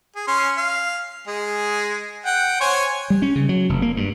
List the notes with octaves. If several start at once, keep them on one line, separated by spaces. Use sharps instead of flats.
G#4
C#4 C6
F5
G#3 G#4
F#5 G5
C5 C#5 G#5
G3
C#4
C#3
F#3
F1
A#3
G2